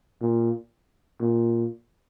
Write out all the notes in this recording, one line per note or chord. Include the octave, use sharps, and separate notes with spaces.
A#2
A#2